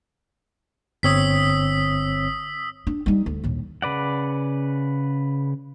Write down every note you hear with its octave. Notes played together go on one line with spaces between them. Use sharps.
G1 C4 C#5 D#6 E6 B6
D4
G3 D#4
D2
A#1 D#2
C#3 B4 D5 F#5